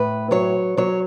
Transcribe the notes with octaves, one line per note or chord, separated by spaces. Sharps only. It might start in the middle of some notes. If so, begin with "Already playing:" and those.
Already playing: A2 B4
F#3 C#5
F#3 C#5